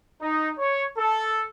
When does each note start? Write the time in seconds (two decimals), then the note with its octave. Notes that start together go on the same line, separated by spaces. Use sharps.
0.21 D#4
0.58 C#5
0.98 A4